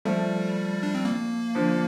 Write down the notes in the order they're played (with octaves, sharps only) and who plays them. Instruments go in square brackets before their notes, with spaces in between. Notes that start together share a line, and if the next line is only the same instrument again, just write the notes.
[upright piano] F3 A3 [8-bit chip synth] G3
[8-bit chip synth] D4
C4
A#3
[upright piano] D3 F3